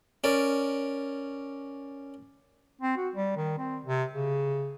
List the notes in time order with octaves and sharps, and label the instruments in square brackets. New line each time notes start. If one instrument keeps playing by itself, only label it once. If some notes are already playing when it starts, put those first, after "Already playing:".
[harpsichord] C#4 A#4 D5
[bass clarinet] C4
F#4
G3
D#3
C4
C3
C#3